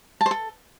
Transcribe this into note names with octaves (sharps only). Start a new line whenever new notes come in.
A5
C5
A4